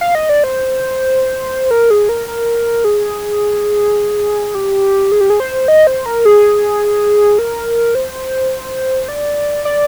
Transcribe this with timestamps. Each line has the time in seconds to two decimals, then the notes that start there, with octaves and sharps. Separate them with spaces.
0.01 F5
0.15 D#5
0.29 D5
0.44 C5
1.71 A#4
1.90 G#4
2.09 A#4
2.28 A#4
2.84 G#4
4.55 G4
5.12 G#4
5.21 G4
5.30 G#4
5.40 C5
5.68 D#5
5.87 C5
6.06 A#4
6.25 G#4
7.39 A#4
7.95 C5
9.08 D5
9.65 D5